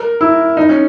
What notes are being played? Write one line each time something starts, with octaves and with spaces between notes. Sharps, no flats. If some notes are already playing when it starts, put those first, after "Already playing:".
Already playing: A#4
E4
D#4
C#4